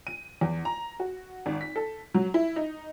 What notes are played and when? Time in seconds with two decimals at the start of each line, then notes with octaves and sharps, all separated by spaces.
0.07 D#7
0.41 E2
0.65 A#5
1.00 F#4
1.46 G#1
1.61 B6
1.76 A4
2.14 F#3
2.34 E4
2.56 D#4